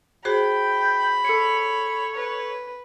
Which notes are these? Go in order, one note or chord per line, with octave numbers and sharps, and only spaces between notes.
F#4 G#4 C5 G5 B5
A4 C#5 C#7
B4